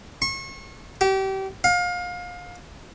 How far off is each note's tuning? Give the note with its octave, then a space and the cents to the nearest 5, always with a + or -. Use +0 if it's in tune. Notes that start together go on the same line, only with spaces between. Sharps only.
C#6 -35
G4 -30
F5 +30